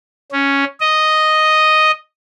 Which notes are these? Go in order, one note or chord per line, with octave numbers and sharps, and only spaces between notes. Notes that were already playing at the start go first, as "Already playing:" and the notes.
C#4
D#5